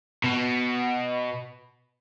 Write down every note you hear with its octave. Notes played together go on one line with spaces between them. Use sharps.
B2